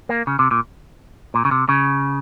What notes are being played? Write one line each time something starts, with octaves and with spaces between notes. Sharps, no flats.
A#3
C#3
C3
A#2
A#2
C#3
C3
C#3